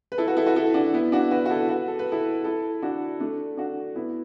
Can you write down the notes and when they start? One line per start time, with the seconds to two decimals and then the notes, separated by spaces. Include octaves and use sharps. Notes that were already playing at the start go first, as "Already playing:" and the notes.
0.12 B4
0.18 E4 A4
0.27 F#4 B4
0.37 E4 A4
0.46 F#4 B4
0.56 E4 A4
0.74 D4 F#4
0.94 B3 E4
1.12 D4 F#4
1.31 F#4 B4
1.46 F#4
1.50 E4 A4
1.69 F#4 B4
1.88 A4
1.99 B4
2.12 E4 A4
2.44 E4 A4
2.82 D4 F#4
3.20 A3 D4
3.57 D4 F#4
3.96 B3 E4